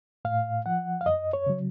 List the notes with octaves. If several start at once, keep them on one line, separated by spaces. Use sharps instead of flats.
A2 F5
F3 F#5
F5
F#2 D#5
C#5
C#3 F#3